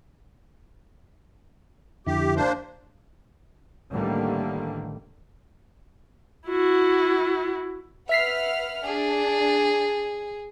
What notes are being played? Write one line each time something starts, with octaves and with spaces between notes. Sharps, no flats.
F2 D3 E4 G4
A#3 D4 C5
A1 D3 D#3 G3 A#3
E4 F#4
B4 E5 F#5 F6 B6 C7
D4 G#4